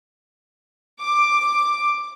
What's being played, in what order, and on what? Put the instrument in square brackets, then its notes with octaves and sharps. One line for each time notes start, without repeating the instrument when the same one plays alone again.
[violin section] D6